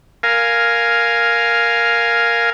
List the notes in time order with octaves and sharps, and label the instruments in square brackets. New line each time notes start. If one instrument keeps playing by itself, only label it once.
[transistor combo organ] A#4 F5 G#5